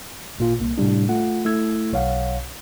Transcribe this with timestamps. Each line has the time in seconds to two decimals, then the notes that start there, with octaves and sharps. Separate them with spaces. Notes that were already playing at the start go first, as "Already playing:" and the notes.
0.38 G#1 A#2 F4
0.60 C2 A#3
0.78 A2 C3 G3 D4
1.09 A3 F4 F#5
1.45 A3 E4 E6 G#6
1.92 B1 C#5 F5 F#5